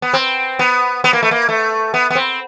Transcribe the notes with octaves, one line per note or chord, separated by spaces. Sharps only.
B3
C4
B3
B3
A#3
A3
A#3
A3
B3
B3
C4